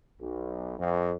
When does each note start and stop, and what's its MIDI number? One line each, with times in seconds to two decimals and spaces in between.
0.20 0.74 35
0.78 1.13 41